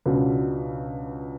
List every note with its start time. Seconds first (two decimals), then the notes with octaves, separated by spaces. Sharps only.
0.06 C#2 B2 F#3 B3 D4